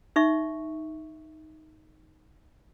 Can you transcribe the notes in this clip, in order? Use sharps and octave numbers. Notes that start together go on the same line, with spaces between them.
D#4 E5 C#6